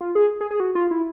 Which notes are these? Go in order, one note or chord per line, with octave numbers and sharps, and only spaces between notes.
F4
G#4
G#4
G#4
F#4
F4
E4